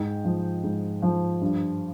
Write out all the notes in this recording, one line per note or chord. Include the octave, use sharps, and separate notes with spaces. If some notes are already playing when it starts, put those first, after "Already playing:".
Already playing: G#2 D#5 G5
F3
G#2
F3
G2